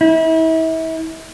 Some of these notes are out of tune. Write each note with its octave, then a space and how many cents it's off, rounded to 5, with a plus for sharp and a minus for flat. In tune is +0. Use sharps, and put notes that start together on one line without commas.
E4 -35